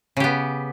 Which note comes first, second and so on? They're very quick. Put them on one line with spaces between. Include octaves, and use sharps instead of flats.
C#3 G4 B3